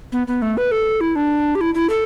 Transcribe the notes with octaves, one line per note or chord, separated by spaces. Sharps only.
B3
B3
A3
B4
A4
E4
D4
G4
E4
E4
A4